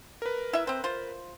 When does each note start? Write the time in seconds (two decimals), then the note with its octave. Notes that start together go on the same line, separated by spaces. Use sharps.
0.22 A#4 B4
0.53 E4 E5
0.67 C4 C5
0.84 F4 C5